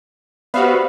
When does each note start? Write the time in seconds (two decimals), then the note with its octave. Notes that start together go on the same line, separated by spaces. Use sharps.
0.54 B3 F#4 G4 C5 D5 E5 F5